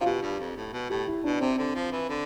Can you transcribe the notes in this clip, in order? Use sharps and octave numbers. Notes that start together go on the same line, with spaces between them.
C3 F4
B2 G4
G2
F2
A2
B2
A2 G4
E4
B2 D4
C3 C4
D3
F3
E3
D3